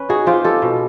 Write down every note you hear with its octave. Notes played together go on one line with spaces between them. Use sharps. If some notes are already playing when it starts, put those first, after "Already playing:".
Already playing: C#4 B4
D#4 F#4 G#4
C4 F4 G4
G#3 G4 A4
B2